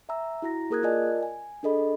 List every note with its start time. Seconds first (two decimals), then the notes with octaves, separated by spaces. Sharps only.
0.09 E5 G#5 A#5 E6
0.42 E4 F#4 A#5 A#6
0.70 A#3 G#4 A#4 D#6 F#6 G#6
0.83 F4 A#4 D5 D#5 G#5 A5
1.23 G#5
1.63 D4 G#4 A4 D#5 B5